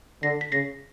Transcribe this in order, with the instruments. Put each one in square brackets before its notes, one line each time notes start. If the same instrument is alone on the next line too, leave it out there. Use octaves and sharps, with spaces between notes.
[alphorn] D3 [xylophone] A#6 C7
[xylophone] B6
[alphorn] C#3 [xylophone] A#6 C7